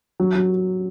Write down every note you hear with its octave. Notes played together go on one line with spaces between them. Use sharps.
F#3
F#3